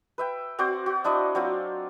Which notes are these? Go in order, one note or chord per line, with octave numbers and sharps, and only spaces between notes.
B4 E5 G5
C4 F#4 C5 D5
F#4
D4 E4 D5 D#5
F#3 C4 F4